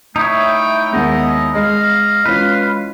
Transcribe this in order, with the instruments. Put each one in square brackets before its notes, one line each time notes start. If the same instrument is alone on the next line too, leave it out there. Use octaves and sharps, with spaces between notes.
[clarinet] A3 [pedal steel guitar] D#4 E4 C#5 [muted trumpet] G5
[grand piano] D#2 G#3 [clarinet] B3 [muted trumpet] D#5
[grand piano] G#3 [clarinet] D#5 [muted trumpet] F5
[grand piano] E3 C#4 F4 [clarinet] G#3 [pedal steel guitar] B4